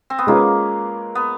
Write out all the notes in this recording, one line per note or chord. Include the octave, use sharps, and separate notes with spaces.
C4
B3
G#3 A#3 C#4 F4 G#4 B4
B3